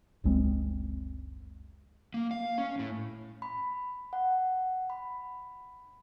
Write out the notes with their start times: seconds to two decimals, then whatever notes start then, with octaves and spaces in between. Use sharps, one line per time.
0.24 F#1 C#2 G#3 C4
2.14 A#3
2.31 F5
2.58 C#4
2.79 A2
3.42 B5
4.13 F#5
4.90 B5